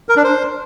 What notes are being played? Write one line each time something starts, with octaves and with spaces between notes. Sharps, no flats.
A#4
D4
C5